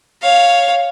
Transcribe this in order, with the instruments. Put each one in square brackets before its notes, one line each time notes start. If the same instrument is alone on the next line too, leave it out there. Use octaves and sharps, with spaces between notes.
[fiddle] C#5 F5